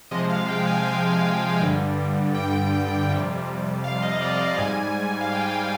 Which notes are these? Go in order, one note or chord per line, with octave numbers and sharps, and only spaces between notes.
C3 F3 G#3 D#5
F5
G5
G#5
G5
G2 D3 G3
G5
F2 C3 G3
F5
D#5
D5
F5
G#2 G3 G#5
F5
G5
F5